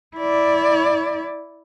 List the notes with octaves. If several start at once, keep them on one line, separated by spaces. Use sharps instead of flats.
E4 D5